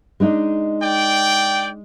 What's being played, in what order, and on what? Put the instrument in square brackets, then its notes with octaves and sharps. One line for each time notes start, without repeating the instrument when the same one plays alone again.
[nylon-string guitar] G#3 D4 D#4
[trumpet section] D5 G5